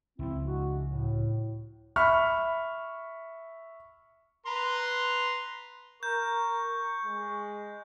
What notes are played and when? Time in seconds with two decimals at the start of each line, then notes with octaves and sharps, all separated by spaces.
0.19 C#2 F3 C4 E4
0.46 G#3 D4 F#4
0.88 A2
1.96 E5 B5 C#6 F6
4.46 B4 A#5 C6
6.03 A#4 C#6 G6
7.05 G#3